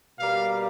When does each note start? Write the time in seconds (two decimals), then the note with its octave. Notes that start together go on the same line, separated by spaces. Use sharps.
0.19 B2 G3 A#3 F5